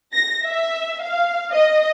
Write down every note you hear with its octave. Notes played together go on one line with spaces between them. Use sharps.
A#6
E5
F5
D#5